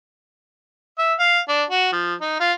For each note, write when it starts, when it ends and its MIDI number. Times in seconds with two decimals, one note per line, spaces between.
0.98 1.14 76
1.19 1.40 77
1.49 1.63 62
1.70 1.91 66
1.92 2.14 53
2.21 2.36 63
2.40 2.53 65